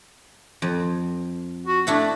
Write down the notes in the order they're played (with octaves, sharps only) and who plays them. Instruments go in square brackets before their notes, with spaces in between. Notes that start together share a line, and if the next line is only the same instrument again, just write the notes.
[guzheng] F2
[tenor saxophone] F#4
[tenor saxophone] A3 [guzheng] D4 E4 F#5